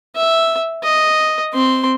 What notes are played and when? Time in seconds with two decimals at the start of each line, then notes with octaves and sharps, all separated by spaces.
0.16 E5
0.83 D#5
1.54 C4 C6